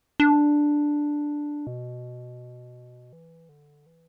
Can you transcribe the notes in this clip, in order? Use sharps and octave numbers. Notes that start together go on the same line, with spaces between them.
D4
B2
E3
D3
E3